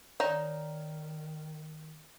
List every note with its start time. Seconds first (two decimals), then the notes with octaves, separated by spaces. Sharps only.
0.20 D#3 D#4 C#5 D5 A#5